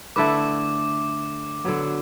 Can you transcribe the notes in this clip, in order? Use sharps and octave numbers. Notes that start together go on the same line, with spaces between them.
D3 A3 E4 B4 D6
D3 F#3 B3